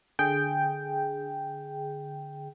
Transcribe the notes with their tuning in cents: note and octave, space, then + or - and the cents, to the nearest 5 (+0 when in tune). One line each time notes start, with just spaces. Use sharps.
D3 +0 G#4 +0 G5 +0